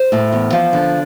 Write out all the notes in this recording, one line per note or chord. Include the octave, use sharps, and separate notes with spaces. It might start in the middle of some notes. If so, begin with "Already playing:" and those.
Already playing: C5
A2
E2
F3
D3